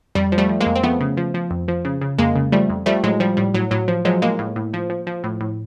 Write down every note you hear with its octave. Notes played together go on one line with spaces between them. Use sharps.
F2 G3
F3
G3 A3
F3
G#3 A#3
F2
C4
F3 A3 B3
C#3
F3
F3
F2
F3
C#3
C#3
F2 G#3 A#3
C#3
F3 G3 A3
F2
F3 G3 A3
A2 F#3 G#3
F3 G3
A2 G3
A2 F#3
A2 F#3
F3
F3 F#3 G#3
A2 G#3 A#3
A2
A2
F3
F3
F3
A2
A2